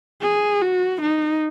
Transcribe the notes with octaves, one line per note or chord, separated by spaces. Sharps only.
G#4
F#4
D#4